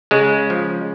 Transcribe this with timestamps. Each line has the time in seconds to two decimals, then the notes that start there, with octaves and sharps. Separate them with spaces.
0.11 C#3 G#3
0.50 F3